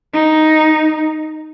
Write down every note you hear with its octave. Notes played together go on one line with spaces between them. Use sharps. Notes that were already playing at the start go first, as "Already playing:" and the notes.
D#4